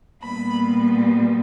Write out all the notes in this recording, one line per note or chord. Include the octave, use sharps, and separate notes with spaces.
A#2 G3 B3 B5